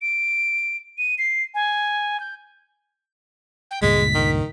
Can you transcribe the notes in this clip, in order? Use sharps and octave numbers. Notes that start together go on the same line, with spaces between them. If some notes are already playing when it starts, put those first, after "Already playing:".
D7
D#7
C7
G#5
G6
G5
C#2 G2 A#2 G#3 B6
D#3